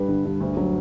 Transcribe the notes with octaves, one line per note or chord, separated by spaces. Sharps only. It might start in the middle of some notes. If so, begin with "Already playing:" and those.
Already playing: G2 G3 B4
D3
G2
D2
F#3